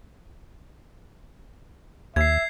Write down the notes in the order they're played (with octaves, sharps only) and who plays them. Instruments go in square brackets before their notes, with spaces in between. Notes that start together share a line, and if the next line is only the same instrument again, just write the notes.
[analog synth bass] D#2 [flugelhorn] E5 [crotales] G#6 C7